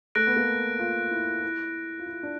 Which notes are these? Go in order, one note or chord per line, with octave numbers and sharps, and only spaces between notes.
A3 F#6 A#6 D7
B3
A#3
F4
E4
E4
F4
E4
D4